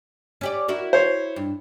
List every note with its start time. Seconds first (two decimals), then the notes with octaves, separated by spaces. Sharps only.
0.41 C#4 G4 D5
0.68 E4 F#4 A#4
0.93 C5 C#5
1.36 G2